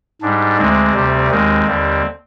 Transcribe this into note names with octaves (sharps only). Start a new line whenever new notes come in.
G#2 G3 D4
D2 D3 G#3 C4
D2 C3 G3
D#2 D#3 G#3 C4
D#2 D3 G3